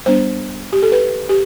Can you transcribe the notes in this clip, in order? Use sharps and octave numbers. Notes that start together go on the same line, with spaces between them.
G3 B3 D4 C5
G4
A4
B4
G4